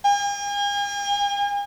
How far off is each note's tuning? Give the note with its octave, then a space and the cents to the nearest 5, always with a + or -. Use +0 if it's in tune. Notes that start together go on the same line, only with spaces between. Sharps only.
G#5 -45